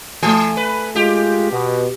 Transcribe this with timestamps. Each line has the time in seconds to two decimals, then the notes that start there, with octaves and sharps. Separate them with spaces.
0.22 E3 A3 G#5
0.57 B4
0.95 G#3 F4 G4
1.51 B2 B3